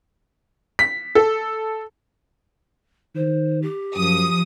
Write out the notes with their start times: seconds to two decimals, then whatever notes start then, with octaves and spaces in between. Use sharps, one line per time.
0.79 B6
1.15 A4
3.15 D#3 C5
3.62 G4
3.96 F#2 F3 D#6